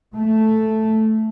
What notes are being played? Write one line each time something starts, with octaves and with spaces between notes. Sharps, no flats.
A3